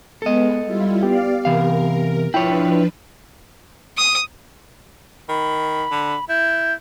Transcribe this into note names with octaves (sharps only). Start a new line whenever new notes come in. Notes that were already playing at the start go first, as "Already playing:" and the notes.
G#3 B3 A4 D#5
G3 E4 F4
B3 G4 D5 F5
C3 E3 A#4 F5
F3 D4 E4 F4 B4 C#5 G5
D#6
D#3 B5
D3
E4 G6